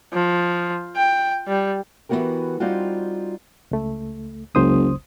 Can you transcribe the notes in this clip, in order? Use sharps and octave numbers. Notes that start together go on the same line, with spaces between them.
F3
G5
G3
E3 G#3 B3 F#4 G4 A#4
G3 C4 D#4 F4 F#4
C#2 A3
F#1 C#2 C5 D#6